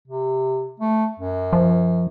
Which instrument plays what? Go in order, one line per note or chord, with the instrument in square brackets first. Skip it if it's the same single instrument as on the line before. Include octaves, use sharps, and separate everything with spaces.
[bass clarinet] C3
A3
F#2
[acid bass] F3